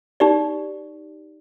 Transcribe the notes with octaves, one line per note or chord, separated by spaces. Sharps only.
D#4 G4 D5